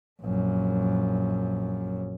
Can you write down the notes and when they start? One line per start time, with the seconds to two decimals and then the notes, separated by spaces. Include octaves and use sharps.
0.21 A#1 F#2